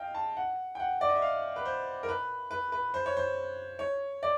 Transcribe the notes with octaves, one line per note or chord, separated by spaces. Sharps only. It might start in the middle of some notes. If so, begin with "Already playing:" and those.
Already playing: D#5 F5 G5
A5
F#5
G5
F#5
D5
D#5
E5
F5
B4
C5
A#4
B4
B4
B4
C5
C#5
C5
C#5
D5